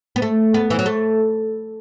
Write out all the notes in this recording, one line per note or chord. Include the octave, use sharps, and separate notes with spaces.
B3
A3
B3
E3
F#3
A3